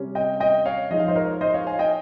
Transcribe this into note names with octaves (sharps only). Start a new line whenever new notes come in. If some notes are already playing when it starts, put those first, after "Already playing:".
Already playing: C3 G3 C#4
D#5 G5
D#5 G5
C#5 F5
F3 G#3 D#4 D#5
F5
C5 D#5
A#4 C#5
C5 D#5
C#5 F5
F5 G#5
D#5 G5